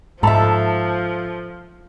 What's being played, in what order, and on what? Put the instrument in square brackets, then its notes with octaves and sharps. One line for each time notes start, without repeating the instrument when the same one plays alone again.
[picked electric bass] G#2 [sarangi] F3 [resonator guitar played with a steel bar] A4 E5 [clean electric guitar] A5